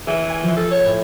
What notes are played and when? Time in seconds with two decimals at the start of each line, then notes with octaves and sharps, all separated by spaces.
0.07 E3 G#4 E5
0.29 G#5
0.43 F3
0.57 A4
0.71 C#5
0.85 A2